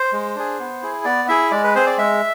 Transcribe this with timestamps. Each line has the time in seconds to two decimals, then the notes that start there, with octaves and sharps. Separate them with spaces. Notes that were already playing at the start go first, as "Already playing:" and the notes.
Already playing: C5
0.13 G#3
0.35 D4 G#4
0.60 B3
0.82 E4 G#4
1.05 B3 D5
1.28 E4 G#4 E5
1.51 G#3 D5
1.64 B4
1.75 C4 G#4 C5
1.86 D5
1.98 G#3 E5